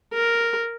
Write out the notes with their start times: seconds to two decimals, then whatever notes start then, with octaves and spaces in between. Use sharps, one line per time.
0.14 A#4